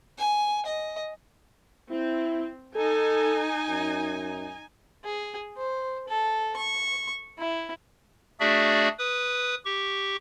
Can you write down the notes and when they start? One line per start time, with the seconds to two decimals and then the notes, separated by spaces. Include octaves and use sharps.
0.18 G#5
0.66 D#5
1.91 C4 E4
2.76 D#4 A4 G#5
3.69 F#2
5.04 G#4
5.57 C5
6.08 A4
6.56 C#6
7.38 E4
8.40 A3 D4 F#4 G#4 D5 E5
8.99 B4 D#6
9.65 G4 C#6